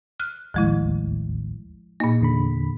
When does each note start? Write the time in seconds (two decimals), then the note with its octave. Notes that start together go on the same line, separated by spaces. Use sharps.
0.20 F6 F#6
0.54 A1 D#2 A2 F3 G#3 E4
2.00 A#2 A#3 D#4
2.21 E2 D3 B5